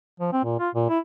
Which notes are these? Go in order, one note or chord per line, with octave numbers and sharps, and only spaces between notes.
F3
C4
A#2
F4
A#2
E4